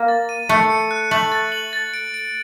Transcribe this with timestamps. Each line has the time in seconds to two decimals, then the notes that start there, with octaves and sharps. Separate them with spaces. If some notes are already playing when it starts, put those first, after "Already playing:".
Already playing: A#3
0.08 A6
0.29 D#7
0.49 A3 C#7
0.70 C#7
0.91 F#6
1.11 A3 F#7
1.32 A6
1.52 F#7
1.73 A6
1.94 D7
2.14 D7